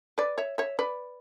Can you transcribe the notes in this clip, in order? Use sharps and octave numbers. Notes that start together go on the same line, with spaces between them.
B4 D5
C#5 E5
C#5 E5
B4 D5